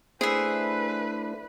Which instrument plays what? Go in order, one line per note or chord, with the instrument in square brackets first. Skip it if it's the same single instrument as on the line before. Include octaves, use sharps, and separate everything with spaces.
[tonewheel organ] A3 D4 E4 [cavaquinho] G#4 E5 [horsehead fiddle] B4 [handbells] C5 C7